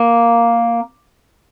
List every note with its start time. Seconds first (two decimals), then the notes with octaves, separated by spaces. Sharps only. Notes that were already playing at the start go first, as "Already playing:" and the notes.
Already playing: A#3